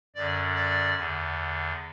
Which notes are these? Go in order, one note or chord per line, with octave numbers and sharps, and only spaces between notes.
F#2 D3 D5
D5
E2 D3